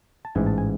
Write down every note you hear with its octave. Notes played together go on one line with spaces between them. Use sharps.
A5
A1 G#2 E3 G#5
A5
G#5